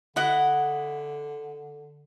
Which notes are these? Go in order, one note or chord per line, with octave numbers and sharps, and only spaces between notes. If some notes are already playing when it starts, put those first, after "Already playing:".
D3 E4 D#5 F#5